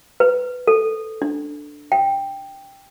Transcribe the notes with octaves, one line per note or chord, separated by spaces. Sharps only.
B4
A4
D4
G5